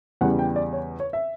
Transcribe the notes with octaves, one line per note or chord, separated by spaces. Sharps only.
E2 C#3 G3 F#5
G5
D5
C#5
C#5
E5